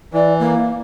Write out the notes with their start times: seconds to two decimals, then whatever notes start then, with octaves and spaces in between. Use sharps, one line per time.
0.13 E3 D5
0.38 A#3